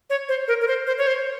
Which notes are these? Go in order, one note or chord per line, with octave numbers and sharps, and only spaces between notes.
C#5
C5
A#4
A#4
C5
C5
C#5
C5